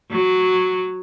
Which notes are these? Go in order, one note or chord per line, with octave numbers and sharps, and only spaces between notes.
F#3